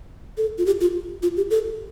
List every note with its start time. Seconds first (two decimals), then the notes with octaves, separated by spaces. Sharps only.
0.38 A4
0.58 F4
0.66 G4
0.81 F4
1.23 F4
1.37 G4
1.50 A4